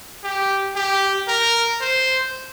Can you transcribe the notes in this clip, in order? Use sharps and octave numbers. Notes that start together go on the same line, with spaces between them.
G4
G4
A#4
C5